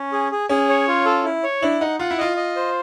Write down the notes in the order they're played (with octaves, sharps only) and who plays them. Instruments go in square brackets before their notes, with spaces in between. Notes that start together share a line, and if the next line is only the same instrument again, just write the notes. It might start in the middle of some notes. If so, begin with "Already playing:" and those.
Already playing: [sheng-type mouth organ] C#4
G#4
G#4
[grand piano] C#4 [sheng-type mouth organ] G#4
[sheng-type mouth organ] C#5
F4
A4
E4
C#5
[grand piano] D4 [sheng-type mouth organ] E4
[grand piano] D#4 [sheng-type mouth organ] F#5
[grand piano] F4 [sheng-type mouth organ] F#5
[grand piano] E4
[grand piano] F4 [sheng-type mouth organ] D#5
[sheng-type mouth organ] D#5
C5